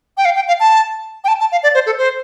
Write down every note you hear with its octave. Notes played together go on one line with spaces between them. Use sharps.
G5
F5
G5
F5
A5
G5
A5
A5
F5
D5
C5
A4
C5